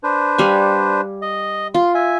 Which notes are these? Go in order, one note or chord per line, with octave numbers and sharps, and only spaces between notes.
D4 B4 C5
G3 F5 G#5
D#5
F4 C6
E5 G#5